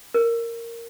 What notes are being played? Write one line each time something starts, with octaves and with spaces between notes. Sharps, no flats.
A#4